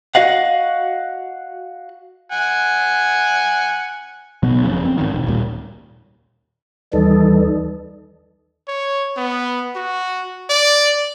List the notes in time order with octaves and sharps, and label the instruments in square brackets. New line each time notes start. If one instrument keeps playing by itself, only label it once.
[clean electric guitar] F#4 D#5 F5 F#5
[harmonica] F#5 G#5
[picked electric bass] B2 F#3 B3
F#1 F2 C#3
C4
G#1 D#3
E1
D#2 A#2 G3 A#3
[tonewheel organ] D#2 D#4 A4 [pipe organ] E3 G3
[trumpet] C#5
B3
F#4
D5